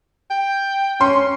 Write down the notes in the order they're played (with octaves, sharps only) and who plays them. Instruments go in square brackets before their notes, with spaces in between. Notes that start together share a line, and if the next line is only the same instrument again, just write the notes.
[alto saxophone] G5
[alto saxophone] C#4 [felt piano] C6